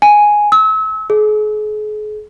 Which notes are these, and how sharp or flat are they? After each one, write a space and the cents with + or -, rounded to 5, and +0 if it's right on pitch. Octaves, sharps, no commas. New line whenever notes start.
G#5 +0
E6 -35
G#4 +40